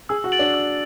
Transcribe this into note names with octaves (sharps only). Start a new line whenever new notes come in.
G#4 E6
F#4
A6 D7 F#7
D4
E6